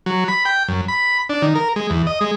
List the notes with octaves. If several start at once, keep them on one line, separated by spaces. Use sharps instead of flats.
F#3
B5
G5
F#2
B5
D4
D#3
A#4
G#3
E2
D#5
G#3